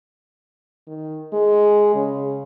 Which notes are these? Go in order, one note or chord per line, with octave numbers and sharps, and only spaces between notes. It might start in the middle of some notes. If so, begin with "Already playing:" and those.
D#3
G#3
C#3